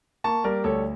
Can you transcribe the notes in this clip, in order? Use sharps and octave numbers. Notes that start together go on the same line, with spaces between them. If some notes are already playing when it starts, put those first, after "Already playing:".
A#3 A5 C#6
G3 A#4 D5
D2 A4 C#5